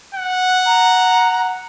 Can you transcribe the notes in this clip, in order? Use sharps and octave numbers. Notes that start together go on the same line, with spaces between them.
F#5
A#5